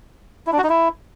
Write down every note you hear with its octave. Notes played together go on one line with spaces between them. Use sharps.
E4
D4
F#4
D#4
E4